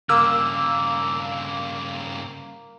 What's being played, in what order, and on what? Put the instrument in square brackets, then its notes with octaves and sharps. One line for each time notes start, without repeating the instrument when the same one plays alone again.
[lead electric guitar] G2 C#3 [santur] A#3 [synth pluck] E6